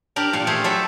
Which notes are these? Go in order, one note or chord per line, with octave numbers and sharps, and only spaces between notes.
D4 G4 A#4
A#2 F5
A3 G4 G#4 C5
F#3 A4 E5